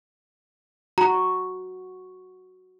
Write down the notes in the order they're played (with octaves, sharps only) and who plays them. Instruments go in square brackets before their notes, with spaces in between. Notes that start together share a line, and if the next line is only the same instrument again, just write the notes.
[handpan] F#4 [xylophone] A#5